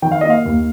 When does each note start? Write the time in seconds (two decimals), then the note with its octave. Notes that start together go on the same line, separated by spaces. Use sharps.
0.02 D#3 G5
0.12 F5
0.21 A#3 D#5
0.30 F5
0.45 D#2